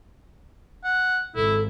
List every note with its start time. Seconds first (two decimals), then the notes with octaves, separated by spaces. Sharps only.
0.84 F#5
1.36 G#1 E4 A4